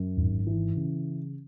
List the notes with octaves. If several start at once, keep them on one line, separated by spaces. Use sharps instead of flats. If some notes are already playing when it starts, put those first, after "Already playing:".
Already playing: F#2
G#1
E3
C#3